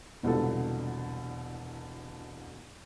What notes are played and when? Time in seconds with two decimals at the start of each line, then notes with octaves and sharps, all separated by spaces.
0.23 E1 C2 B2 D3 F4 A4